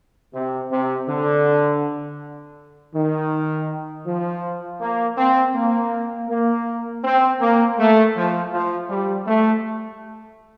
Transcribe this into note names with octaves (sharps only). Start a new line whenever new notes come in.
C3
C3
D3
D#3
F3
A#3
C4
A#3
A#3
C4
A#3
A3
F3
F3
G3
A3